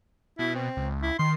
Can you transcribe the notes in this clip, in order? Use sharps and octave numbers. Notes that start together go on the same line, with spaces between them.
B2 E4
C4
C#2
E4
D#3 C6